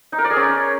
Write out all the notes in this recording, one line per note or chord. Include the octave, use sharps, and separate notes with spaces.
D#4
A#4
D5
G#4
C#4